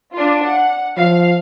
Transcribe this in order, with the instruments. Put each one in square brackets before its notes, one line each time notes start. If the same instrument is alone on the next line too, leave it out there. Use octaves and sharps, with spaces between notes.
[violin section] D4 F4
F#5
[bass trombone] F3 [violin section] F5